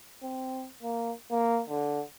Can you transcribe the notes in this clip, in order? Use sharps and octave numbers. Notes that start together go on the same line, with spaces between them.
C4
A#3
A#3
D3